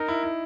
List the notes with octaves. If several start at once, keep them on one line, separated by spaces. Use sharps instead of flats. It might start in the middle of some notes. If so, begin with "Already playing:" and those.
Already playing: D#4 A#4
E4
E4